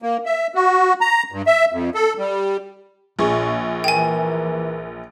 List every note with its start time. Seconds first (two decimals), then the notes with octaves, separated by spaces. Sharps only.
0.02 A#3
0.26 E5
0.55 F#4
1.01 A#5
1.32 G2
1.47 E5
1.72 F2
1.95 A4
2.18 G3
3.19 A#1 A#2 G#4 C#6
3.84 E3 A#4 G5 G#5